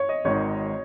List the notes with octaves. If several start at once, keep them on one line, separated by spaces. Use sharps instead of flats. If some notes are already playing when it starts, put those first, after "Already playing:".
Already playing: C#5
D#5
G#1 G#2 D#3 C#5